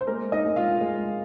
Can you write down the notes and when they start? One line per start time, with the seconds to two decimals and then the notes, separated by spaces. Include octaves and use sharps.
0.01 C5
0.07 G#3 A#3 A#4
0.32 D#4 D#5
0.45 G#3
0.56 F4 F5
0.81 G#3